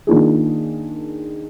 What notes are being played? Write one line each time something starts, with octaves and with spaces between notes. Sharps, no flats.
D#3 A#3 D4 F4 G#4